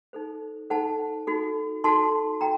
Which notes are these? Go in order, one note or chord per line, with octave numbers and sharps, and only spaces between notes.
D#4 A4 C5
D#4 A4 C5 F#5 A5
D#4 F#4 A4
D#4 F#4 A4 A5 C6
D#4 F#4 A4 G5 A#5